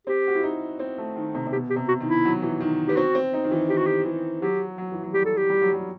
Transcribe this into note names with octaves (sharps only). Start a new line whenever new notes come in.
C4 G4
F#4
E4
D#4
C4
A3
D#3
C3
C3
B2 G4
G4
C3
F#4
D#3
E4
F#3
E3
D#3
B3 G4
C4 F#4
C4
D#4
D#3
E3
D#3 G4
F#4
G4
E3
F#3 G4
F#3
E3
F#3
G3 G4
A4
G4
G3
F#3
G3